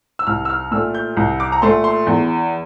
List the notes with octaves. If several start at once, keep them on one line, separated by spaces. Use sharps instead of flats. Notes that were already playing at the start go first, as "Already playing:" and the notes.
E6
C2 F6
E6
F6
A#2 A3 E6
G6
C2
D6
A#5
A#2 A3 C6
C6
E2